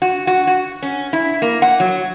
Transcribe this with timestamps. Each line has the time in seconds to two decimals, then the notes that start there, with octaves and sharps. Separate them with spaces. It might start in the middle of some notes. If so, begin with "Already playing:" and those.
0.02 F#4
0.27 F#4
0.47 F#4
0.82 C#4
1.13 E4
1.42 A#3
1.62 F#5
1.80 F#3